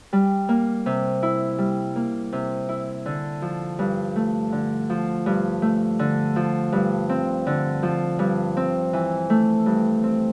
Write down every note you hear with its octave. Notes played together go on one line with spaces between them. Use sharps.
G3
A#3
C3
E4
G3
A#3
C3
E4
D3
F3
G2
A3
D3
F3
G2
A3
D3
F3
G2
C4
D3
F3
G2
C4
E3
A3
G2
C4